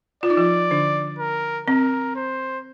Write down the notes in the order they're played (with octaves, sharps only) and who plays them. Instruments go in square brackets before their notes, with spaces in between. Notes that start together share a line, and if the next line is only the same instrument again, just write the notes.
[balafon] F4 [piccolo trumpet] D5
[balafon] D#4
F3 F4
D3 D4
[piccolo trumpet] A#4
[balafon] C4 [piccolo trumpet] A#4
[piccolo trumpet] C5